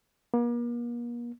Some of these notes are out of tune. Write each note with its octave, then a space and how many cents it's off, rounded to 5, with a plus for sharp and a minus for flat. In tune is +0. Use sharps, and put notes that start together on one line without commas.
A#3 +40